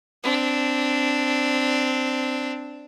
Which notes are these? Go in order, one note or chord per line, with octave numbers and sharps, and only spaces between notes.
C4 D4